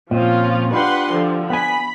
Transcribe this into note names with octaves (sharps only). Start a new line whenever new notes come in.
A#2 F3 C4 C#4 F4
D4 F4 G4 B4 F#5 C6
D3 F3
B3 G#5 B5